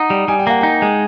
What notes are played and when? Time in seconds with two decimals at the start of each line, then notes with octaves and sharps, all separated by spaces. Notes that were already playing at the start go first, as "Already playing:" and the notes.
Already playing: D#4 F#5
0.10 G3
0.28 G3 G#5
0.39 G5
0.47 A#3 F#5
0.61 D#4 G5
0.82 G#3